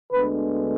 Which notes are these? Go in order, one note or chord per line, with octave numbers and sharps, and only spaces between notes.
D2 D3 G#3 B3 B4